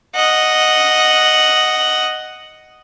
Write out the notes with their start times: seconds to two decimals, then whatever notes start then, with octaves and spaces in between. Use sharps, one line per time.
0.16 D#5 F#5